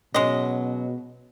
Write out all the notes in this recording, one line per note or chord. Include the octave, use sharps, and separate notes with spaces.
B2 F#3 G#3 C#4 D#5